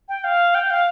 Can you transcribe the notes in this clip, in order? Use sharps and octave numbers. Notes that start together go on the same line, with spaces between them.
G5
F5
G5
F5